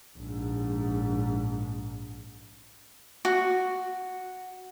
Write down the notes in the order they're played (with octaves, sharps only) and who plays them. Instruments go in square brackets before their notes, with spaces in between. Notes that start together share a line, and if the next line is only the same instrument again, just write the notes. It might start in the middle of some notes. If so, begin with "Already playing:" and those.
[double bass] A#1 G#2
[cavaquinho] F#4